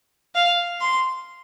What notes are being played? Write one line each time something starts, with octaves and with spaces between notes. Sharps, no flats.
F5
C6